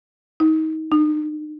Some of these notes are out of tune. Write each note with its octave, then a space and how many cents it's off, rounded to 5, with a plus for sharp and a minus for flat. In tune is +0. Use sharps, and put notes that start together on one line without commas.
D#4 +25
D#4 -40